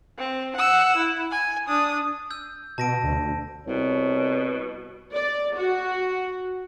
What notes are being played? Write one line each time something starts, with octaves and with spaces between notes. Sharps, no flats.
C4
F#5 E6
E4
G#5
D4 D#6
E6 G6
B2 A5 A#6 D7
D2
C2 B2 C#5
D5
F#4